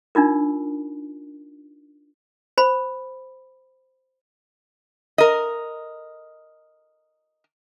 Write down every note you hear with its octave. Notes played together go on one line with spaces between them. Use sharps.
D4 D#4 F4 A#4
C5 B5
A#4 D#5